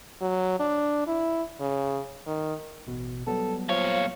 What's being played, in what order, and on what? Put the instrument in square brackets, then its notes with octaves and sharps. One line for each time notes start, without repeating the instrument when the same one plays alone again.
[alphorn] F#3
D4
E4
C#3
D#3
[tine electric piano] A1 B2
[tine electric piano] F#3 G3 B3 [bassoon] A4
[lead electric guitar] A#2 C#5 [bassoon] F3 [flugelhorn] F5